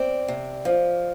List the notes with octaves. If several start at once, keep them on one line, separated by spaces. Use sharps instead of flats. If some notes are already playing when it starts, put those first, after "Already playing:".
Already playing: C4 D5
C3
F3